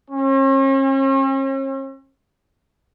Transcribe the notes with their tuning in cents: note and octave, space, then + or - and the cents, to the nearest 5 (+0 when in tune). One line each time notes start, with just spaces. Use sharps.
C#4 -45